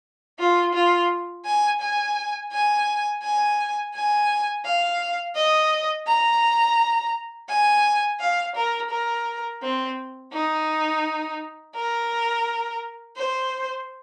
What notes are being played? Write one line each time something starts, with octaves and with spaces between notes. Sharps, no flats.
F4
F4
G#5
G#5
G#5
G#5
G#5
F5
D#5
A#5
G#5
F5
A#4
A#4
C4
D#4
A#4
C5